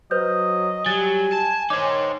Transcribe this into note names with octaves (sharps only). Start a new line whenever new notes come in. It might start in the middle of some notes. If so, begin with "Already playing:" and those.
F#3 B4 C5 D#5 G6
F#3 G3 G4 G#5 A6
A5
D#3 D#4 C5 C#5 D6